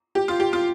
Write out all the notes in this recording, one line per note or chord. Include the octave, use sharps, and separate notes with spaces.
G4
F4
G4
F4